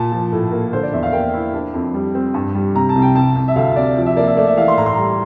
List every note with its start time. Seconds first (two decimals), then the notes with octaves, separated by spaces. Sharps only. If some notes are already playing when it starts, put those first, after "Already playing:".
Already playing: A#2 A5
0.12 F3
0.32 A2
0.51 A#3
0.72 D3 C5
0.83 D5
0.93 E2 E5
1.03 F5
1.13 A#3 G5
1.34 E4
1.54 D4
1.74 F2
1.94 G3
2.15 C4
2.34 G2
2.55 G3
2.74 C3 A#5
2.89 A5
2.96 C2
3.02 G5
3.15 C2 A5
3.36 C2
3.48 E5
3.56 D2 F5
3.76 C3 D5
3.97 F3
4.06 E5
4.17 A#3 D5
4.27 E5
4.37 A3 D5
4.47 E5
4.57 E3 F5
4.68 C6
4.77 A2 A#5
4.86 C6
4.95 G3 A#5